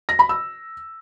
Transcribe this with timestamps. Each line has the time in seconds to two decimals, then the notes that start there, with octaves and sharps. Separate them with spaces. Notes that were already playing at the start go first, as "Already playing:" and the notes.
0.09 A#6
0.19 B5
0.29 E6